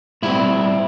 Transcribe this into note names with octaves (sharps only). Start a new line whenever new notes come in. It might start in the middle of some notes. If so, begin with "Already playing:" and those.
A2 G3 C4 E4